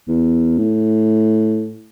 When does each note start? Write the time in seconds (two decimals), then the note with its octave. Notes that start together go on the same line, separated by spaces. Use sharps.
0.08 E2
0.58 A2